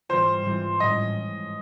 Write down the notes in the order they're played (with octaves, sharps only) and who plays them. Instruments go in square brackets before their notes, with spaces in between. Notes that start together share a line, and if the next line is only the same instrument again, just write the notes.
[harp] G#2 E3 G3 C4 F4 [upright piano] C5
[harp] G#2 E3 G3 C4 F4
[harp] A2 F3 G#3 C#4 [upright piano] D#5